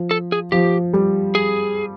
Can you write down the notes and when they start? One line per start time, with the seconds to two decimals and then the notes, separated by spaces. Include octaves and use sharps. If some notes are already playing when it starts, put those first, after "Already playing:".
Already playing: F3
0.11 A4
0.32 G#4
0.52 F3 G4
0.93 G3
1.35 G#4